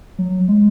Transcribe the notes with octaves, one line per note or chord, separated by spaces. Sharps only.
F#3
G#3